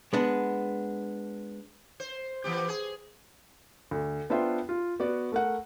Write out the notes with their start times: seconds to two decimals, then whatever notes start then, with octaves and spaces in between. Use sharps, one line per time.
0.13 G#3 B3 D4
2.00 C5
2.44 E3 B3 G4
2.68 G#4
3.91 D2
4.30 B3 D4 F4 C5 E5 G5
4.69 F4
5.00 B3 F#4 D5
5.32 A3 A#4 F#5